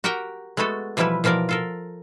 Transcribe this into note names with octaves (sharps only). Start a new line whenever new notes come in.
F#4 G4 A#4 F#5 G5
G#3 A3 B3 F#4 A4
B2 E3 F3 G3 E4 B4
B2 E3 F3 A#4 D5
F4 A4 A#4